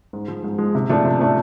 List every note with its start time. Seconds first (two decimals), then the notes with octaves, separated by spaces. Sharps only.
0.13 G#2
0.28 F3 G#3
0.44 G#2
0.58 F3 G#3
0.75 C3
0.89 F3 A3 D4
1.05 C3
1.20 F3 A3 D4